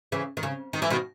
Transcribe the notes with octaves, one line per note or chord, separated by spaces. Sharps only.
C#3 E3
D#3
C#3
D#3
E3
B2 D#3